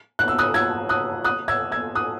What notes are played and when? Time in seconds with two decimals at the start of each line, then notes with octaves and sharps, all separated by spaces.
0.19 F#6
0.28 E6
0.39 D#6 F#6
0.54 E6 G#6
0.89 D#6 F#6
1.25 D#6 F#6
1.48 E6 G#6
1.72 E6 G#6
1.95 D#6 F#6